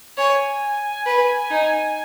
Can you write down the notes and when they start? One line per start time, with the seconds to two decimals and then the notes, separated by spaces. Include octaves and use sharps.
0.18 C#5 G#5
1.06 B4
1.51 D#4